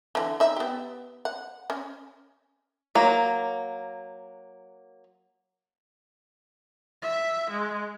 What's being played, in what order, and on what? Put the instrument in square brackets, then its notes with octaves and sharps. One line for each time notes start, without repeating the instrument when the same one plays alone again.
[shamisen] D3 E3
D#4 E5
B3 G4
F#5
C#4
[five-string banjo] F#3 A#3
[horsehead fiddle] E5
G#3